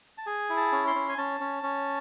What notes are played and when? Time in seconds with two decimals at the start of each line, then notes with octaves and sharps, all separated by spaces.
0.18 A5
0.26 G#4 G#5
0.50 E4
0.57 A5
0.72 C#4
0.87 C6
0.95 C#4
1.09 G#5
1.18 C#4 A5
1.40 C#4
1.63 C#4